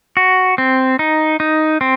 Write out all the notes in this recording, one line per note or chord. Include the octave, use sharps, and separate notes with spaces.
F#4
C4
D#4
D#4
C4